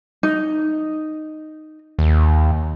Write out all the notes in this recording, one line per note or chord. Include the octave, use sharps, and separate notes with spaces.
D#4
D#2